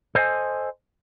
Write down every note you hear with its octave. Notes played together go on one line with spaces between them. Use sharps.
A4 C5 D#5 G5 G#5